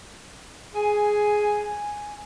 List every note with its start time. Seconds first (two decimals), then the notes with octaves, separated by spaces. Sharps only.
0.74 G#4 G#5